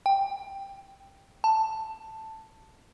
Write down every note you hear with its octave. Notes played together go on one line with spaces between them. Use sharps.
G5
A5